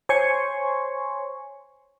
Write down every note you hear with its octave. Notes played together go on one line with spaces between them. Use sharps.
C5 C#5 G#5 C6 C#6